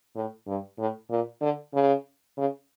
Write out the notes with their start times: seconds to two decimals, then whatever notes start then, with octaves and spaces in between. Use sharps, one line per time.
0.16 A2
0.47 G2
0.78 A2
1.10 A#2
1.41 D3
1.73 C#3
2.37 C#3